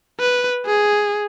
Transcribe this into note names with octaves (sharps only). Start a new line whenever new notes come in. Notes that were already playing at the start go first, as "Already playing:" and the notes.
B4
G#4